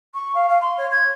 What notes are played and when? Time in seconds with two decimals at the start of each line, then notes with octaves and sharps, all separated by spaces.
0.14 C#6
0.35 F5
0.49 F5
0.61 C6
0.77 C#5
0.91 G#6